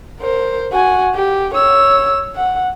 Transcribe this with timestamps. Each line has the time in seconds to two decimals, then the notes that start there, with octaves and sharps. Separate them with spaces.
0.20 A#4 C5
0.73 F#4 G#5
1.15 G4
1.54 C#5 E6
2.36 F#5